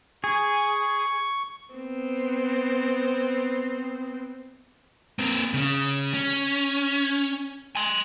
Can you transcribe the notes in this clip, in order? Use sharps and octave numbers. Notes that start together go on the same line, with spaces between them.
G#4 C#6
B3 C4
A#3 C4
C#3 C#4
C#4
G#5 C6